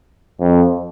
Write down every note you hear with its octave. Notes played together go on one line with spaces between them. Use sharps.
F2